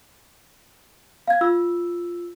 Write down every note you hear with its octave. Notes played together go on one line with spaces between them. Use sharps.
F5 G#6
F4 E6